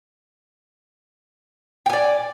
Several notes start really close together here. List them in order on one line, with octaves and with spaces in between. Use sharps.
G5 G#5 D5